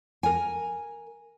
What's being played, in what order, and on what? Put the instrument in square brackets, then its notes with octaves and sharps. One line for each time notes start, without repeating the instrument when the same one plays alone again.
[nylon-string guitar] A#4 G#5